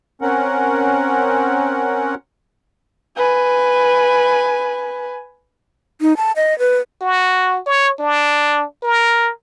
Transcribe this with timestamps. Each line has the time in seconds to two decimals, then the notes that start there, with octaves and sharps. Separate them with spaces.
0.22 C4 C#4 A#4 F#5
3.17 B4 G#5
6.01 D#4
6.17 A5
6.36 D#5
6.59 B4
7.01 F#4
7.66 C#5
8.00 D4
8.83 A#4